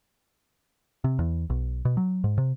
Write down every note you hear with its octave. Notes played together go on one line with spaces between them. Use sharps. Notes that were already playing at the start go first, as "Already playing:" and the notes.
C3
E2
B1
B2
F#3
G#2
C3